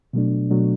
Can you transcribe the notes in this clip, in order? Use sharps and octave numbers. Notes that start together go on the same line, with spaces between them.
B2 F#3 A3 D4
B2 F#3 A3 D4